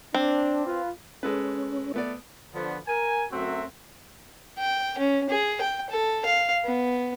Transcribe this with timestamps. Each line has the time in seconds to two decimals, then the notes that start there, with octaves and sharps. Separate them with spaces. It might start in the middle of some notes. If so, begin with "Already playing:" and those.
0.14 C4 D4
0.66 F4 B4
1.23 G#3 C#4 A4 B4
1.94 A3 B3 D5
2.53 D3 F3 B3
2.87 A#4 G#5
3.31 F#2 F#3 A3 C4 F#4 E5
4.58 G5
4.98 C#4
5.29 G#4
5.61 G5
5.90 A4
6.25 F5
6.65 B3